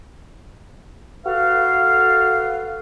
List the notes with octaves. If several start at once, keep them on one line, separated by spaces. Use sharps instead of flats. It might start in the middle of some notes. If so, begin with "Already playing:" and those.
F#4 A4 B4 F5